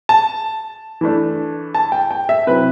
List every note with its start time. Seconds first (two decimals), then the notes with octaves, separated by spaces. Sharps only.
0.09 A5
1.01 E3 A3 D4
1.75 A5
1.92 G5
2.11 G5
2.29 E5
2.47 C3 F#3 C4 E4 B4